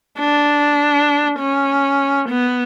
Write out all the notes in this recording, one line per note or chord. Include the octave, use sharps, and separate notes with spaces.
D4
C#4
B3